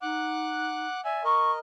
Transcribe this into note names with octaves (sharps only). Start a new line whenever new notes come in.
D#4 F#5 D6 F#6
D5 E5 G#5
A#4 D#5 C#6